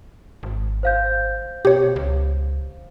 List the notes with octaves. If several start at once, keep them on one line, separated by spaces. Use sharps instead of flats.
G#1
C5 F5 G6
B2 G4 C#5
C#2